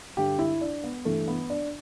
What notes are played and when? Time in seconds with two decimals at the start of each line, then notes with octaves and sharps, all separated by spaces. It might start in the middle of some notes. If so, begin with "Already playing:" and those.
0.17 G2 D3 G4
0.39 E4
0.61 D4
0.84 B3
1.05 G2 E3 A3
1.28 B3
1.50 D4